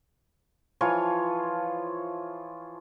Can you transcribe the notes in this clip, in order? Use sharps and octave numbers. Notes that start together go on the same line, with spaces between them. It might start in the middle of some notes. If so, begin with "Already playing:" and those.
E3 F3 F4 C#5